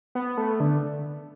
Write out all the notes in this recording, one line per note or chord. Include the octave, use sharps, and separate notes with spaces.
B3
A3
D3